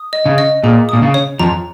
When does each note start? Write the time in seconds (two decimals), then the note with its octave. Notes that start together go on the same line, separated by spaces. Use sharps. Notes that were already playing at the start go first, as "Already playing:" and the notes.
Already playing: D#6
0.13 D#5
0.26 C#3
0.38 D#5
0.64 A#2 G#4
0.89 A#2 D#6
1.02 C#3
1.14 C#5
1.39 F2 F3 A#5